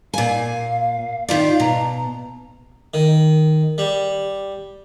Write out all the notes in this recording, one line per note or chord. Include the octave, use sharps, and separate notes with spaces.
A#2 F5 G#5
D#3 F4 D5 F5
B2 A#5
D#3
G3